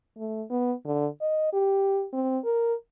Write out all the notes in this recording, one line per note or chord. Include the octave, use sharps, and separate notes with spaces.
A3
B3
D3
D#5
G4
C4
A#4